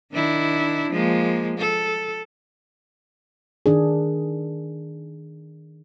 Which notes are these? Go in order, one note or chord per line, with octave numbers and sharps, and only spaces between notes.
D#3 D4 E4
F3 G#3 A#3
A4
D#3 D4 G#4